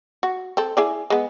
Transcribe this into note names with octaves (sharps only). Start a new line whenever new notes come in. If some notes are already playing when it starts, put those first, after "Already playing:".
F#4
C4 A4
E4 G#4 D5
G#3 B3